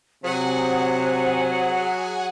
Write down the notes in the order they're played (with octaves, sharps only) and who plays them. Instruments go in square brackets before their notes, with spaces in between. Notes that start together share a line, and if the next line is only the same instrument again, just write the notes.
[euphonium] C3 [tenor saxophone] F#3 [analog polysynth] G#4 F#5 G#5 [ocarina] C5